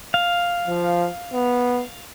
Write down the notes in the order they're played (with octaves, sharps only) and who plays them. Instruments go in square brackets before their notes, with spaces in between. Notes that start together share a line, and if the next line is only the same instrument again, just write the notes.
[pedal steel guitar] F5
[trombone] F3
B3